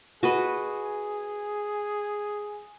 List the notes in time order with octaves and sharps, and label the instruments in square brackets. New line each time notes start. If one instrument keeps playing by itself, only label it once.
[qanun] F#4 B4 D#5 [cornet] G#4